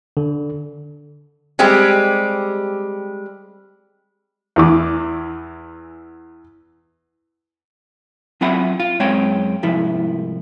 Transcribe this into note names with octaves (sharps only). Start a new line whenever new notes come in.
D3
G3 G#3 C4 G4
E2 E3 D6
F#3 C4 F4 E5 F#5 B5
F4
F#2 G#3 C4 C#5 G5
C2 G#2 F3 E4